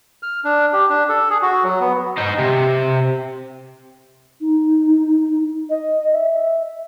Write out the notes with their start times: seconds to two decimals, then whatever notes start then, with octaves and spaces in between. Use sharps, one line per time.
0.23 F6
0.44 D4
0.73 G4
0.90 D4
1.09 A4
1.30 G#4
1.42 F#4
1.64 F#3
1.81 B3
2.18 D#4 C5
2.39 C3
4.41 D#4
5.70 D#5
6.13 E5